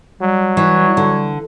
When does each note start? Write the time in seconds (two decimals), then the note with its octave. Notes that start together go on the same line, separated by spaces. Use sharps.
0.21 F#3 G3
0.57 E3 C#5
0.97 D3